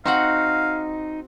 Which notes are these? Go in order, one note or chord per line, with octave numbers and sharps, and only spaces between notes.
C4 D#4 F#4 F5 F#5